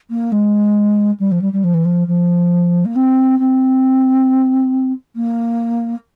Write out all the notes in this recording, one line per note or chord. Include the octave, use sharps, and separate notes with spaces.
A#3
G#3
G3
F3
G3
G3
F3
E3
F3
F3
A#3
C4
C4
A#3